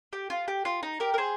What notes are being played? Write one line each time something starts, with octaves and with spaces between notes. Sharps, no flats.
G4
F4
G4
F4
D#4
G4 A#4
A#4
G#4 C5